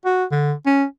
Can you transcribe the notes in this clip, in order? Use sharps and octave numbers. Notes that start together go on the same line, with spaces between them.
F#4
D3
C#4